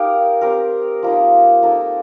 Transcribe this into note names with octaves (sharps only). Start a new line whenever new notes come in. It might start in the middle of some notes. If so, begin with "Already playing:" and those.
Already playing: D#4 G4 A#4 F5
C4 G4 A#4
F3 A#3 D#4
A#3 D#4 A4